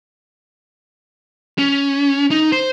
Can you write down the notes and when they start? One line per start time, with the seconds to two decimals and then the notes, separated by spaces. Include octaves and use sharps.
1.58 C#4
2.31 D#4
2.52 C5